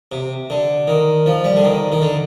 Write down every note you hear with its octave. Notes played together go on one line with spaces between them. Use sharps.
C3
D3
D#3
F3
G3
D3
D#3
D#3
D3